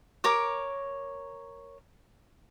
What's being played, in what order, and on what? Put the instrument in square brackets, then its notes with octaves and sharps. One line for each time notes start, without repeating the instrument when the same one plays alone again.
[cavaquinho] A#4 C#5 D6